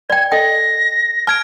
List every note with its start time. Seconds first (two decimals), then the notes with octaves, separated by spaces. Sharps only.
0.10 D5 G5 G#6
0.32 A4 D#5 G5 A#6
1.27 A5 F6 G#6 D7